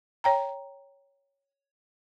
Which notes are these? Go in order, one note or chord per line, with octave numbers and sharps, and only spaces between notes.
C#5 G5 A#5